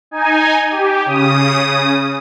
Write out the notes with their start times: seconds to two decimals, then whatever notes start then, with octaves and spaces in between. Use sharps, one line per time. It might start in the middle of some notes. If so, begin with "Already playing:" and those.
0.11 D#4 G#5
0.71 G4
1.06 C#3 D#6